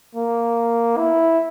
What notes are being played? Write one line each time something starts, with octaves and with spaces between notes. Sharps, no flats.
A#3
E4